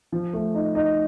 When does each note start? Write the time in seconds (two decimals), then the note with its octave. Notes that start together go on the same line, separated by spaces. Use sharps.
0.12 F3
0.33 A3
0.54 D#4
0.75 D#4